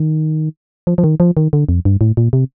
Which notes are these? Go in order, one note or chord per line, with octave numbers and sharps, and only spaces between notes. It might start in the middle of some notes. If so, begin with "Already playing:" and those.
Already playing: D#3
F3
F3
D#3
F3
D#3
D3
F2
G2
A2
A#2
C3